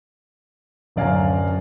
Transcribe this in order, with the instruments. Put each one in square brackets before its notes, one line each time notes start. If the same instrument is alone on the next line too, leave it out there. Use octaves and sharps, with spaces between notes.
[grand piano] D1 F#2 D5 F5 G#5 A#5